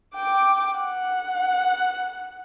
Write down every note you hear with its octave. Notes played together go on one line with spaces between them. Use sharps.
G5 D6
F#5